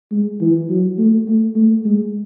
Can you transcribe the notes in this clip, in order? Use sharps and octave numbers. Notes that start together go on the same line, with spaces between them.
G#3
E3
F#3
A3
A3
A3
G#3